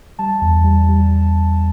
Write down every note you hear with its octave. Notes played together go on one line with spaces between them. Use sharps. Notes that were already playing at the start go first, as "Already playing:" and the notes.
G3 A5
E2
G3
G3